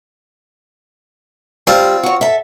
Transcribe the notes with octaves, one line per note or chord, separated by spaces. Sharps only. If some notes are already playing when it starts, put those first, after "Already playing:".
G3 C4 F4 A5
F#4 C#5
A4 E5